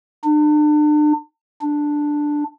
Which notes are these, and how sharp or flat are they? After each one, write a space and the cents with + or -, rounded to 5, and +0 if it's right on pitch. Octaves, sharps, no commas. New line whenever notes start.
D4 +40
D4 +5